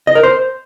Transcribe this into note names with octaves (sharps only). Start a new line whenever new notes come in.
D#5
A#4
C5